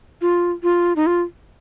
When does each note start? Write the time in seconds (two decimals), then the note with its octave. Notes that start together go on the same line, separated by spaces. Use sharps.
0.21 F4
0.63 F4
0.96 D#4
1.07 F4